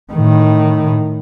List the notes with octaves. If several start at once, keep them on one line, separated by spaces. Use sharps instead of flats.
A2 D#3